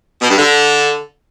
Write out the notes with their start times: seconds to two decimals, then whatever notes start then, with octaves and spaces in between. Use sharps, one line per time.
0.22 B2
0.30 G2
0.38 D3